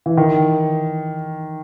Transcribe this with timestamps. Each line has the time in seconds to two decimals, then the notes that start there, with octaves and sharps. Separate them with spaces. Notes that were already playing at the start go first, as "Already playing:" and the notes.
0.06 E3
0.17 D#3